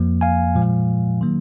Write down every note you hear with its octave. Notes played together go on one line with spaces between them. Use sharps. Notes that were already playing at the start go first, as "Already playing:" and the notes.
Already playing: F2 F3 A#3
F5 G#5
A#2 F3 G#3
D#3 F#3 A#3